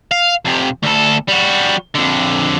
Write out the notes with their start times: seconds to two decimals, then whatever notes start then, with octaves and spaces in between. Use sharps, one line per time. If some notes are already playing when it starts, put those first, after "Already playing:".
0.11 F5
0.45 F2 C3
0.83 D2 A4
1.28 G3 F#4
1.95 F2 D3